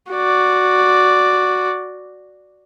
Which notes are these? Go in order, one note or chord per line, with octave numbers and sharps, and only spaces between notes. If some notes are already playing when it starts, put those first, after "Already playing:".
F#4 D5